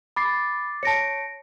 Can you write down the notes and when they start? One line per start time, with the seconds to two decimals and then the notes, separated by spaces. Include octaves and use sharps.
0.16 B5 D6 A6 C7
0.83 C#5 A5 A#6 C#7 D7